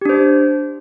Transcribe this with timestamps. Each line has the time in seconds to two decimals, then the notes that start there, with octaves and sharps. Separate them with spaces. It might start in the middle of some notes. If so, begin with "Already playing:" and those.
0.01 G4
0.05 D4
0.09 C5